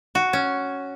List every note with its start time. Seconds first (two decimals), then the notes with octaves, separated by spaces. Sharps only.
0.15 F#4
0.33 C#4